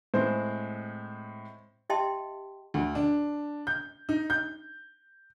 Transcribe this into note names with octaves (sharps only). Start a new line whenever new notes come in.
A2 G#3 C4 C5
G4 D#5 E5 G5 A5 C6
D2
D4
G6
D#4
G6